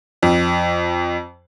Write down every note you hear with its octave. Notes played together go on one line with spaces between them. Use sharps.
F2